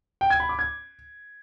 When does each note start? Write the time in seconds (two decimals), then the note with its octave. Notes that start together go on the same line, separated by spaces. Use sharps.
0.21 G5
0.30 G#6
0.40 B5
0.49 D6
0.59 G#6